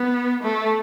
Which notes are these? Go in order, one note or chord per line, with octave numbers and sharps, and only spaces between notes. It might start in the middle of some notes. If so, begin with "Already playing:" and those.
Already playing: B3
A3